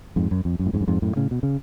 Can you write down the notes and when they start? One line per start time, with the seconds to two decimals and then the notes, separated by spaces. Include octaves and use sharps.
0.16 F2 G#2
0.31 F#2
0.45 F2
0.59 F#2
0.66 A2
0.73 F2 G#2
0.81 F#2
0.88 F2 G#2
1.02 F#2 A2
1.16 A2 C#3
1.31 B2
1.43 C#3